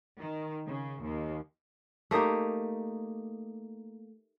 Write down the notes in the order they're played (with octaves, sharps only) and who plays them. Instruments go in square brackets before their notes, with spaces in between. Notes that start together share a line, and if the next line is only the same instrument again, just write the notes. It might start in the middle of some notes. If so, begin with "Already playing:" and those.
[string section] D#3
C#3
D#2
[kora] A3 A#3 D#4 G4